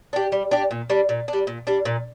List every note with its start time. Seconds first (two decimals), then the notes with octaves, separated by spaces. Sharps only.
0.13 D4 G4
0.32 G3
0.51 D4 G4
0.71 A#2
0.90 G3 D4
1.09 A#2
1.28 D4
1.33 G3
1.47 A#2
1.67 G3 D4
1.85 A#2